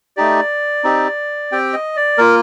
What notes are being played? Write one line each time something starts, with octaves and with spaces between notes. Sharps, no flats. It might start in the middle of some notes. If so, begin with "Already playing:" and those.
A3 D#4 G4 D5
C4 D#4 G4
C4 G4 G5
D#5
D5
A#3 F4 A#4